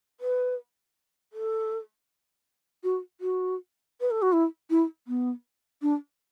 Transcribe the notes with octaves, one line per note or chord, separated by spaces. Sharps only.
B4
A4
F#4
F#4
B4
A4
F#4
E4
E4
B3
D4